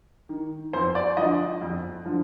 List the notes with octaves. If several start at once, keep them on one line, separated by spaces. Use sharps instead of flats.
D#3
F2 C5
D5
D3 F3 D#5
F2
D3 F3